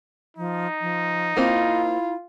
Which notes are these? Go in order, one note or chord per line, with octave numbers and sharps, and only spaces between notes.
F3 D#4
F3
A#3 C4 E4 F4